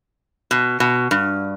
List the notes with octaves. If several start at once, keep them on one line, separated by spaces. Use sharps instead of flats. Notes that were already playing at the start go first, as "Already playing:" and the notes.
B2
B2
G2